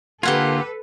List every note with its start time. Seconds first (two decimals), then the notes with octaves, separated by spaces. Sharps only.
0.23 D3 A#3 F4 G4 A4 B4 F#5 G#5